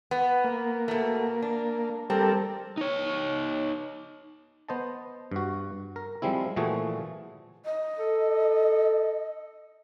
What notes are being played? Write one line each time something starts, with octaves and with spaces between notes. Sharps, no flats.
B3
A#3
B2 A3
D4
G3 C4 A4 A#4
D#4 C#5
B3 C5 D#5 A5
G2 F#4
A#4
F3 G3 G#3 C4 E4
A#2 E3 F3 A3 F#4 G#4
D#5
A4